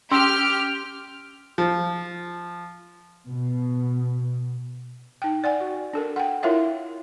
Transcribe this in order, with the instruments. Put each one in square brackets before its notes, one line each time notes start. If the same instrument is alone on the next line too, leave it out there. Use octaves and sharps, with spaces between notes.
[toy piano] C#4 C6 E6 [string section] G4 F6
[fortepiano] F3
[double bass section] B2
[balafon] D#4 G5
D5 F#5 G#5
F#4
D4 A4 A#4
F#5 G5
E4 F4 A#4 C#5 E5 F5